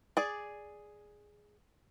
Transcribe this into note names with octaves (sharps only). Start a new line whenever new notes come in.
G#4 D5